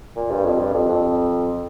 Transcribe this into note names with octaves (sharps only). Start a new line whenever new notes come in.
A#2
G2
F2
G2
F2
F2